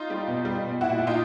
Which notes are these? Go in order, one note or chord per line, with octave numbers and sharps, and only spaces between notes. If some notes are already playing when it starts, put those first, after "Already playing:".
Already playing: D#4 F4
G3
B2
G3
B2
A#2 E4 F#4
A#2
D#4 F4